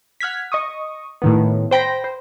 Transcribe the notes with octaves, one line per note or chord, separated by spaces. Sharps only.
F#5 F6 G#6 B6
D#5 C#6 D#6
A2 D#3 B3
C5 G5 B5 A#6
C5